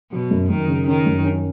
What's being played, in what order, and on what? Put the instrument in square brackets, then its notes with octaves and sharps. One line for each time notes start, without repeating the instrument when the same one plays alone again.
[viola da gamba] B2 [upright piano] F#3
[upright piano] F#2
[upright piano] F#2 [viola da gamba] D#3
[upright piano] C#3
[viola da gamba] D#3 [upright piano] C#4
[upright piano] F#2
C#4